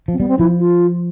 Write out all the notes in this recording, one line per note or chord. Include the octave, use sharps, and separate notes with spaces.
F3
C4
G3 B3
C4
F3 E4
F4